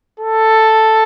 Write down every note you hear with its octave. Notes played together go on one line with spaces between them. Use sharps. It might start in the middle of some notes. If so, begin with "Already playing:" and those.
A4